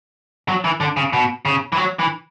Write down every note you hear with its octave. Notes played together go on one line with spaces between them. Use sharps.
F#3
E3
D3
C#3
B2
C#3
E3
F#3
E3